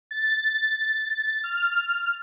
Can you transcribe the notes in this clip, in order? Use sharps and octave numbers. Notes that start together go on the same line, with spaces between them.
A6
F6